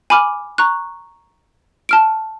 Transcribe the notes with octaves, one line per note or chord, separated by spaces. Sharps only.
G#5 B5 D6 F6
A#5 C#6 F#6
A5 F6 D7